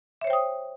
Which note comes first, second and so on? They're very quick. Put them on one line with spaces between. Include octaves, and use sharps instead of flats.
E5 C#5 C5 G5 D#6